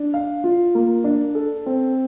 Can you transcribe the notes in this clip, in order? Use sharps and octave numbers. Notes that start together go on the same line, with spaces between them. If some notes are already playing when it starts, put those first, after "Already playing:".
Already playing: D4
F5
F4
A#3
D4
A4
C4